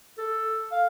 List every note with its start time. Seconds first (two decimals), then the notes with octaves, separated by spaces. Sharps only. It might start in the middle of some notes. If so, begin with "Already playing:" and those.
0.18 A4
0.72 F5